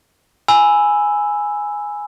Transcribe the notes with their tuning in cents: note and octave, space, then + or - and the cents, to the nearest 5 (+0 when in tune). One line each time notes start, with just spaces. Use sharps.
G#5 +0 B5 +0 E6 +0